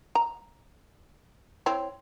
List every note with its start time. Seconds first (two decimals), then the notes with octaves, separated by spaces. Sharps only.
0.15 A#5
1.66 C4 E4 C#5